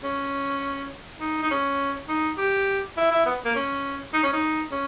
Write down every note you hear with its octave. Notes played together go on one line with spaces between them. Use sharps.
C#4
D#4
D#4
C#4
D#4
G4
E4
E4
B3
A#3
C#4
D#4
C#4
D#4
C#4